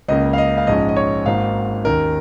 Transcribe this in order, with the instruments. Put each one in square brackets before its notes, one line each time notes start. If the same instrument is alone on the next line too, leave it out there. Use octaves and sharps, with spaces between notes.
[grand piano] C#2 C#3 A#3 D#5
F5
D#5
F5
A#1 G#2 G#3 C#4 D#5
D#5
C#5
G#1 G#2 D#3 A#3 F5
D#2 D#3 C#4 A#4